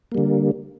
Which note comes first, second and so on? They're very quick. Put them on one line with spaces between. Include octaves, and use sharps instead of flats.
A#3 G3 D3